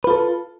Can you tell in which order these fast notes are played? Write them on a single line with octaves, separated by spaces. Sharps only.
B4 F4 A4